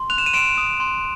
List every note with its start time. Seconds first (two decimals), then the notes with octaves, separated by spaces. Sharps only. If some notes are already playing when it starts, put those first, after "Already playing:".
Already playing: C6
0.10 F#6 F7
0.18 E7
0.26 D#7
0.34 C6 D7 E7
0.58 D#6
0.80 C6